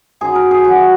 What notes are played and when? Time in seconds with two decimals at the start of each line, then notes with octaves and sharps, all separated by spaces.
0.21 F#2 D#3 F#3 G#4
0.35 A#4
0.51 G#4
0.64 F#2 D#3 F#3 F#4